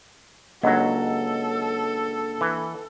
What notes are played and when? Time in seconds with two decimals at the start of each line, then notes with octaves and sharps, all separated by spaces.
0.63 C#2 F#3 A#3 D4 A4 D#5 F#5
2.41 E3